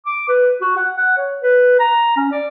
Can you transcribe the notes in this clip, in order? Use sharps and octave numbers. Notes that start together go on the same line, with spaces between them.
D6
B4
F#4
F#5
F#5
C#5
B4
A#5
C#4
D5